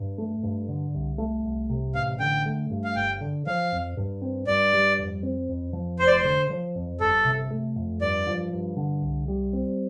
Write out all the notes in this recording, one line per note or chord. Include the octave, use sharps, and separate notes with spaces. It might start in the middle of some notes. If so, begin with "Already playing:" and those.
Already playing: G2
A3
G2
D3
C2
A3
C2
C3
A1 F5
D3 G5
A3
G2
F5
G1 G5
D3
F3 F5
F2
G2
C4
G2 D5
G3
F2
C4
F2
F3
F1 C5
D5
C5
D3
F3
F2
G1 A4
C3
A3
F2
G2 D5
F3
G2
D3
C2
G3
C4